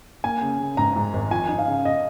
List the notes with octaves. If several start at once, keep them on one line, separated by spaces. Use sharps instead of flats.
A#3 G#5
C#3
C#3
G#2 A#5
G#2
G#1
F3 G#5
D#4
F5
C#3
D#5